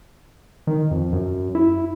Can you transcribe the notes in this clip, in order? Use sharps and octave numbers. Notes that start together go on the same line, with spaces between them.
D#3
F2
F#2
E4